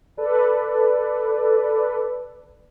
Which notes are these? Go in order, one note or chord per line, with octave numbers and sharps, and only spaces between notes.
A4 B4 D5